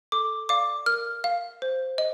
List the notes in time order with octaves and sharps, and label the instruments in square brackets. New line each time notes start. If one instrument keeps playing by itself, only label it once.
[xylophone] A4 D6
D5 F5 D6
A#4 F6
F5
C5
D#5